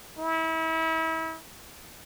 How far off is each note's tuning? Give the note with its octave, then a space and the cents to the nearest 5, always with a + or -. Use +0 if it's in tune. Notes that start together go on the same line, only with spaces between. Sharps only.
E4 -35